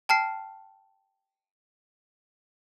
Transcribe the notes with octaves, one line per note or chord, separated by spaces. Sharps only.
G5 A5 F6 C7